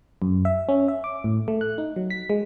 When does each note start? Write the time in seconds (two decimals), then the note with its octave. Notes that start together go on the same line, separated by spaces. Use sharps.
0.22 F#2
0.45 E5
0.69 C#4
0.88 E5
1.04 D6
1.24 A2
1.48 A3
1.61 F#6
1.78 D#4
1.96 F#3
2.10 B6
2.30 G#3